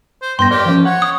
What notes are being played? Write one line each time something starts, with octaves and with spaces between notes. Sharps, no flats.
C5
G2 B3 G5 C6 A#6
G4 A#4 C#5 D5
F3 C#4
C#5 F#5
D#6